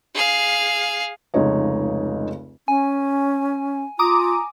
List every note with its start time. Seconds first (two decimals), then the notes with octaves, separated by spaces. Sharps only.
0.15 G#4 F5
1.34 F1 C#2 C#3 D#4 C#5 D#5
2.68 C#4 G#5
3.99 F4 A#5 D6 D#6